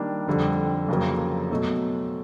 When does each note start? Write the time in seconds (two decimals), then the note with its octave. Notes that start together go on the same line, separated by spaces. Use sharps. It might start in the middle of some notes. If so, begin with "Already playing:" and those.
Already playing: D#3 G3 A#3 D4
0.27 F2 D3 G3
0.89 F2 C#3 F#3 A#3
1.51 B2 F#3 A3